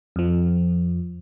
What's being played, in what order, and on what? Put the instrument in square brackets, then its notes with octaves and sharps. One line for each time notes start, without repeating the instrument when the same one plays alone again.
[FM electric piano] F2 F3